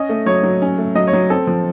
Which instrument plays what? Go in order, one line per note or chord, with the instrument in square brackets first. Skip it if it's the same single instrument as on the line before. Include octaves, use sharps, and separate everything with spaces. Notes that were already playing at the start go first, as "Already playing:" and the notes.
Already playing: [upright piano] C#4 [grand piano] D#5
[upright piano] A3
[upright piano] F#3 [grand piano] C#5
[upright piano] F#3
C#4
A3
[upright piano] F#3 [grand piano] D#5
[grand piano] C#5
[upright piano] F#3
[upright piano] C4 [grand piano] A4
[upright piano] F3